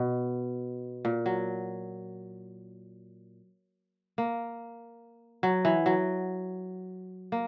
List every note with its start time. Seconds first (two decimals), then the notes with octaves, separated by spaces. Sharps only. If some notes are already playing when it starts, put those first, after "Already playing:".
Already playing: B2
1.05 A#2
1.26 F#3
4.18 A#3
5.43 F#3
5.65 E3
5.86 F#3
7.32 A#3